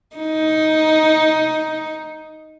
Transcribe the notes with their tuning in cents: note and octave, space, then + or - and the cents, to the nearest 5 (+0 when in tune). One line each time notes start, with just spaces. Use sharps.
D#4 +10